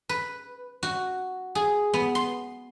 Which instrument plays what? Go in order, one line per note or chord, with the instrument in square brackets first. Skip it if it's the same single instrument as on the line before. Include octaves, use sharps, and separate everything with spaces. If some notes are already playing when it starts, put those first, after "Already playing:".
[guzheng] B4
F#4
G#4
B3
C6